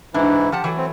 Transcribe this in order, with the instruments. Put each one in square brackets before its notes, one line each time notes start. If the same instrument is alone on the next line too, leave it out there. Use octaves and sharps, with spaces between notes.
[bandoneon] G#2 E3 E4 [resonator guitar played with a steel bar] D4
[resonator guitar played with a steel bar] F3 F#5 A5 [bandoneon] G4
[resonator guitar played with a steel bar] E3 F#3 A3
[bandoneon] C4